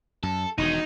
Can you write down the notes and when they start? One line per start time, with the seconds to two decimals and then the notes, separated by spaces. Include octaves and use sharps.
0.23 F#2 A4
0.58 E1 B2 D#3 F#3 D#4